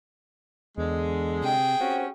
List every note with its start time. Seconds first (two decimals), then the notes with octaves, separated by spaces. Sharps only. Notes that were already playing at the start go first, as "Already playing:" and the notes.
0.77 E2 D3 G#3
1.43 C3 G#4 G5
1.81 C4 C#4 F#4 G4